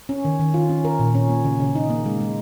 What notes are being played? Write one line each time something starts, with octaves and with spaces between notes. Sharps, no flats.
C#4
D#3
D#3
F4
C#4
A#4
A#2
C#4
A#3
C#3
C#3
D#4
A#3
G#3
G#3